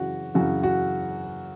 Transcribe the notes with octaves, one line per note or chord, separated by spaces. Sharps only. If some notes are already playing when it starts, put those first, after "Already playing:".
Already playing: F#2 C#3 E3 F#4
F#2 C#3 E3 F#4
F#4